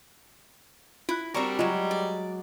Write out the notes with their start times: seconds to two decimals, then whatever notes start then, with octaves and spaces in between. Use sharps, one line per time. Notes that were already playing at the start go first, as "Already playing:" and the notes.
1.09 E4 F4 F#6
1.34 G3 C4 D4 F#4 A#4 A#5 C#6
1.59 F#3 G#3 F4
1.91 D5